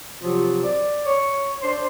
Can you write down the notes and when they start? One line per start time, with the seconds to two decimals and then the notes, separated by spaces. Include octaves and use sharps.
0.23 C3 F3 F#3
0.64 D5
1.05 C#5
1.62 D4 C5